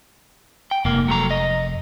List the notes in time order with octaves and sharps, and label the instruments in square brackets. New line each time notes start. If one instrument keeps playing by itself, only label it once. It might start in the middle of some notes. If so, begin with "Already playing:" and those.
[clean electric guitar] G5
[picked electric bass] F1 [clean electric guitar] G#2 A#3
[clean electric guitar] F#3 A3 A#5
D#5